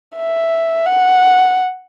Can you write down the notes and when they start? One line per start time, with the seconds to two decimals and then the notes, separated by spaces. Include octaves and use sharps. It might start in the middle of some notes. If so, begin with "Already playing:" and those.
0.17 E5
0.86 F#5